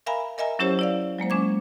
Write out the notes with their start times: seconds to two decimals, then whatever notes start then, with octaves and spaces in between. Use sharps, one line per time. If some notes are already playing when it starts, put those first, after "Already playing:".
0.06 A#4 E5 F5 G#5 A#5 B5
0.38 A#4 D#5 E5 G#5 A#5
0.59 F#3 C#4 E4 G4 C5 C#5
0.79 E4 D5 F5
1.18 F#3 G#3 A#3 C5
1.30 G#3 C#4 D6 G#6